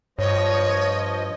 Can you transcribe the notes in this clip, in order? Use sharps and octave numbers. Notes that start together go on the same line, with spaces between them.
G2 F3 C#5 D#5